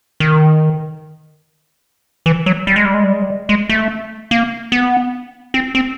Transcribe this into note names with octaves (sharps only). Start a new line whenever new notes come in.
D#3
E3
F#3
G3
G#3
G3
G#3
G3
G#3
G3
G#3
A3
A#3
B3
C4
C4